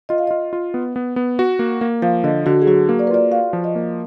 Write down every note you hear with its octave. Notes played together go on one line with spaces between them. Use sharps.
F4 D#5
F5
F4 D#5
F4
B3
B3
B3
F#4
A#3
A#3
F3 F5
D3 D#5
D3 F#4
G#4
F#3 F#4
A#3
D5
B4
F4 D5
F#4 F5
F3
D#5
A#3